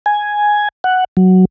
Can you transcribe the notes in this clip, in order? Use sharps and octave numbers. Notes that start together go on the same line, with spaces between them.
G#5
F#5
F#3